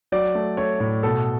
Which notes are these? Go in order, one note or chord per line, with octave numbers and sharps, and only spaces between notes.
F#3 D5
A3
A3 C#5
A2
B2 A4